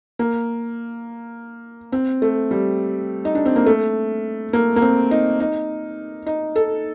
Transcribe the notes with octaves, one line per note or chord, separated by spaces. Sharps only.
A#3
C4
A3
G3
D#4
D4
C4
A#3
A3
A#3
A#3
C4
D#4
D#4
D#4
A4